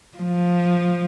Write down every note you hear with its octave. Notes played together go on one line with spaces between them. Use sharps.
F3